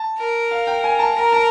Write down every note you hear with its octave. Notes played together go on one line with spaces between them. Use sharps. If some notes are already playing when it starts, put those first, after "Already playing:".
Already playing: A5
A#4
F5
G5
G#5
A5
A#4 A#5
A5